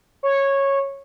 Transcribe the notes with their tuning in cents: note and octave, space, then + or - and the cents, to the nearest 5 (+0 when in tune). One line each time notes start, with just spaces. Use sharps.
C#5 -10